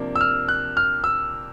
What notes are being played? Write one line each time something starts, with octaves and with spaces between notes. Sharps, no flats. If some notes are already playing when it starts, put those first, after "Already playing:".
Already playing: C3 F3 A#3 D4
E6
F6
F#6
F6
E6